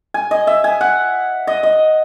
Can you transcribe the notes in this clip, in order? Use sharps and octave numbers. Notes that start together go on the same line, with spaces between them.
G#5
D#5
E5
G#5
F#5
D#5
D#5